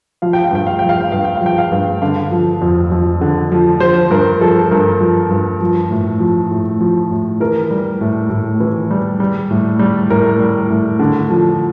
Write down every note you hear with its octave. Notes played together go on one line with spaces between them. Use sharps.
F3 F5
G5
F5
G2 G5
F5
F3 G5
F5
G5
G2 F5
G5
F5
F3 G5
F5
G2
D3 F5
F3
F2
F2
D3
F3
F3 C5
G2 A#4
F3 A4
G2 A#4
F3
G2
F3
A2
F3
A2
F3
A2
E3 A#4
G3
A2
A2
E3
G3
G3
A2
G3
A2 A#4
G3
A2
D3
F3